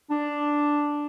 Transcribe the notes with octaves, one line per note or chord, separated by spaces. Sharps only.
D4